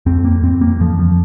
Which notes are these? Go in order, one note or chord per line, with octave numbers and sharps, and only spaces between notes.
F2 C4
A#3
F2 C4
A#3
F2 F3
F3